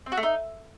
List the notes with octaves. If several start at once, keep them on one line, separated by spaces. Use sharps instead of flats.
C4
F#4
A3
D#4